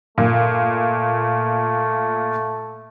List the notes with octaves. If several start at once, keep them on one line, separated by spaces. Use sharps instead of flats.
A#2 A3